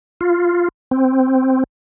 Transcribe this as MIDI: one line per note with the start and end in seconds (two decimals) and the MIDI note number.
0.21 0.68 65
0.91 1.64 60